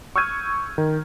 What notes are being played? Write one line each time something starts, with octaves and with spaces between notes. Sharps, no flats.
C#6 E6 F6 G6 G#6 D#7
D#3